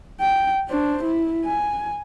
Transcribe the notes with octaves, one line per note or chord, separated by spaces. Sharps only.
G5
D4 C5
E4
G#5